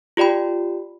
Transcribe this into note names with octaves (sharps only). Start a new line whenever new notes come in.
F4 G4 D5 G5 B5